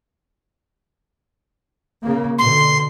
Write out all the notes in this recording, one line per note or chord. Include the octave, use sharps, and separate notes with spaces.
C#3 A#3
B2 D3 C6